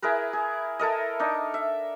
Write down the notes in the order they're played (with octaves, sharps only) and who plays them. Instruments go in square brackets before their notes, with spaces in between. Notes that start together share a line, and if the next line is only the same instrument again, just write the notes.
[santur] E4 G#4 A#4 B4
G#4
E4 A4 A#4 D#5
D4 D#4
E5